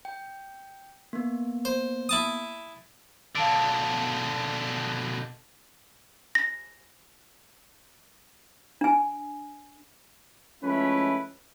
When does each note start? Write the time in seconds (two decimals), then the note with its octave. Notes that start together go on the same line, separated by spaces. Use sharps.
0.05 G5
1.13 A#3 B3
1.65 C5
2.09 E4 A5 D#6
3.35 B2 D3 F5 A5 D7
6.35 A#6
8.81 D4 G#5
10.62 F3 G#3 A3 C#4 E4 B4